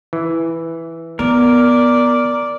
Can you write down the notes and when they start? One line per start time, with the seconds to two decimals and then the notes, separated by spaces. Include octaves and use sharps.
0.13 E3
1.19 B3 A#4 D5